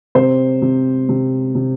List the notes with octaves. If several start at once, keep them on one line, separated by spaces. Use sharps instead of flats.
C3 C5
C3
C3
C3